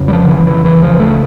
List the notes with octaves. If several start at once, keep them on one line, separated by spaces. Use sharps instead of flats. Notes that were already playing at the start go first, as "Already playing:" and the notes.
Already playing: F2 C#3
G3
F3
D3
E3
E3
E3
C#2 C#3 F3
A3